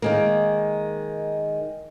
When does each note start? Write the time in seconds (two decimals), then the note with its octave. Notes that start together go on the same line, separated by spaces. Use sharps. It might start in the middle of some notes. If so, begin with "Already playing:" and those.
0.02 D#3 G#3 A#3